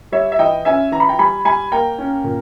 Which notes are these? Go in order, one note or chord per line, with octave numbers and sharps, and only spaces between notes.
G3 C#5 E5
E5
E3 D#5 G5
C#4 E5 G#5
E3 A#5
B5
G5 A#5
G3 G#5 B5
G3 G#5 B5
A#3 G5 A#5
C#4
A#2